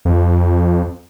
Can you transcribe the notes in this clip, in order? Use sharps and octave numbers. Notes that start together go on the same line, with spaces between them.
F2